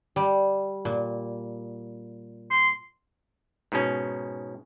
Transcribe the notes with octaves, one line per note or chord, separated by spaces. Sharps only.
G3
A#2
C6
G#2 B2 C#4